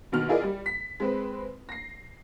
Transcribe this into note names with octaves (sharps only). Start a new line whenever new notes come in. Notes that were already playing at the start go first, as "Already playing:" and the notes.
B1 B2 D#3 F6
E4 F4 G#4 A#4 D5 D#5
G3
B6
G#3 C4 B4
A#6 C7